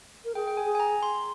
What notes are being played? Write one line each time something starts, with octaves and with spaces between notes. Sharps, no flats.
A#4
G#4 G5
G5
G#5
G#4
G#5
A#5
C6